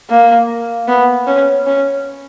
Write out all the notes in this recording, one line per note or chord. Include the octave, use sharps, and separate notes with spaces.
A#3
B3
C#4
C#4